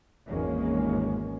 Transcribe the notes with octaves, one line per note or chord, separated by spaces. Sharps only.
G#1 E2 D#3 G#3 A#3 C#4